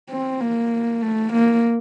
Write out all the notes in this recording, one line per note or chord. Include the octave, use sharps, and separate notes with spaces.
C4
A#3
A3
A#3